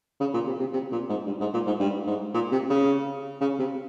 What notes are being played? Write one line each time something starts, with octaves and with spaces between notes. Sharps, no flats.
C#3
A#2
C3
C3
C3
A#2
G#2
G2
G#2
A#2
G#2
G2
G#2
A#2
C3
C#3
C#3
C3